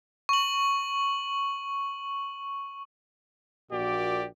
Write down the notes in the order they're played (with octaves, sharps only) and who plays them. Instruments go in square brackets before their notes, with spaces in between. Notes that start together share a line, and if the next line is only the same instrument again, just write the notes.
[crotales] C#6 F#7
[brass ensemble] A#1 A#2 F#4 G4 D5